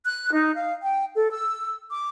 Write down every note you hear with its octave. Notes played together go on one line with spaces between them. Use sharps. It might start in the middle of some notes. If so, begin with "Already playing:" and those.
F#6
D#4
F5
G5
A4
E6
D6